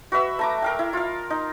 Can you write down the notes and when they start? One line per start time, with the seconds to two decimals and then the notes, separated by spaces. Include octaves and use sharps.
0.12 F#4 B4 E5 E6
0.39 A3 A#5 D6
0.62 A#4 F5 G5
0.79 E4
0.93 F4 F5
1.30 D#4